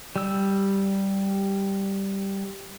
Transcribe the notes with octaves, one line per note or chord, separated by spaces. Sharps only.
G3 E6